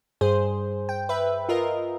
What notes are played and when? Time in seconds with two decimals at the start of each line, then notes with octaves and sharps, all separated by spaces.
0.21 G2 G#4 C5
0.89 G5
1.09 B4 E5
1.49 F4 A#4 D#5